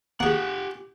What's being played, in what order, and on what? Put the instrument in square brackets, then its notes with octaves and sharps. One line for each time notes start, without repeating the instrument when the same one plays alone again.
[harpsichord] A#3 G#4 [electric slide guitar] G4 F#5